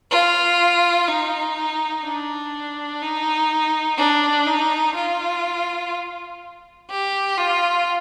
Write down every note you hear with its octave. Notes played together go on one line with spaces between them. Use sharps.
F4
D#4
D4
D#4
D4
D#4
F4
G4
F4